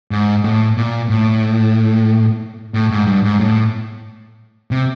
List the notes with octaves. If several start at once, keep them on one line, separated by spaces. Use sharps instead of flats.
G#2
A2
A#2
A2
A2
G#2
G2
G#2
A2
C3